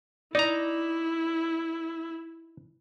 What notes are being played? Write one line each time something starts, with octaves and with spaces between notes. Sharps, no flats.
D#4 E4 D5 A#5